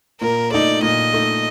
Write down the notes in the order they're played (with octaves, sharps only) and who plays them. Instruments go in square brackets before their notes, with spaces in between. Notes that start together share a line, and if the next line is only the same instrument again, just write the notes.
[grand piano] A#2 [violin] A#4
[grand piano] A3 D#4 [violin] D5
[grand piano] A#2 [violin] D#5
[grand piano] A3 D#4